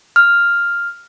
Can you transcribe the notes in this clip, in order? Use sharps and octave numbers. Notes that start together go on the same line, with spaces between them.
F6